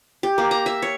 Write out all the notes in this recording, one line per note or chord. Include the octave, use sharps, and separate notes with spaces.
G4
A#3
A#5
E5
C#5